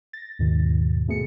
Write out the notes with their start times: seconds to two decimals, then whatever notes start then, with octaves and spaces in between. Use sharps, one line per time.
0.13 A6 A#6
0.39 D#2 G#2 B2 D#3
1.08 B2 A3 B3 G#4 C#7